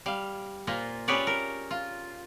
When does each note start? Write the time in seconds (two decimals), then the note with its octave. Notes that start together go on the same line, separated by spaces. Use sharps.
0.06 G3 F5
0.67 A#2 A#3 F4 C5
1.08 C#4 G4 G#4 B4 C#5 D5
1.27 A#4
1.71 F4